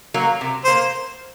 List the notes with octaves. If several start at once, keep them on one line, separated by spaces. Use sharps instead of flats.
F#3 A#3
C3
C5
A#3